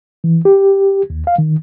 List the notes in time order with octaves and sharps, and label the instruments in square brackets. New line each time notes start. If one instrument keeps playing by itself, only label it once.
[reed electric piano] E3
G4
D#2
F5
D#3